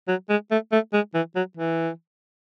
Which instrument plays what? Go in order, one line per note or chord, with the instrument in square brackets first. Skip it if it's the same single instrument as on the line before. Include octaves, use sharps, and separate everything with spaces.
[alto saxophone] F#3
G#3
A3
A3
G#3
E3
F#3
E3